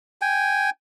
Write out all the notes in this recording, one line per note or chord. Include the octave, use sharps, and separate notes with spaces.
G5 G#5